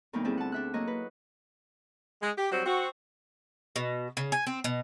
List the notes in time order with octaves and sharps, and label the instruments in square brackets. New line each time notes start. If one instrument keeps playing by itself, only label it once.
[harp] D2 F#3 A#3 B3 D#4 G5
G3 C4 E4 F4 G#4 A4
F#5 A5
D4 E5 F#6
F#3 A#3 C#5 D#5
B4
[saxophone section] G#3
G4
F#3 G3 C4 F#4 C5
C4 F#4
[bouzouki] B2
C#3
G#5
C4
B2